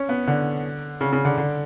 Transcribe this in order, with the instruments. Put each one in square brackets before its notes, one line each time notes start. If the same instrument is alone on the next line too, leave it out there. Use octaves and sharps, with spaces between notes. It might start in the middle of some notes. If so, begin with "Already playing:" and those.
Already playing: [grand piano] C#4
B3
D3
C#3
C#3
D3
D3